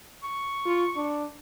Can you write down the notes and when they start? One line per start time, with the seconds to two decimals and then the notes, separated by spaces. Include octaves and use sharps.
0.24 C#6
0.65 F4
0.96 D4